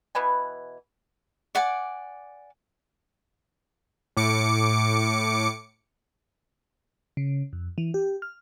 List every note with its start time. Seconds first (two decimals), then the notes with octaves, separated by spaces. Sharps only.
0.15 B2 E3 B4 G#5
1.55 D5 F#5 G#5 D6
4.17 A2 D6 C#7
7.17 C#3
7.53 F2
7.78 E3
7.94 G4
8.22 F6